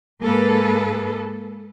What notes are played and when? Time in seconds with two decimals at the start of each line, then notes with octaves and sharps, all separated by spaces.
0.22 G#2 A#3 G#4 A4 B4